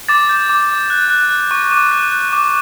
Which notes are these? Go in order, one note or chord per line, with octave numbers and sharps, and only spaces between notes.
D6 A6
G6
D6
D6
F#6
F#6
F#6
C#6
D6
F#6
F#6
D6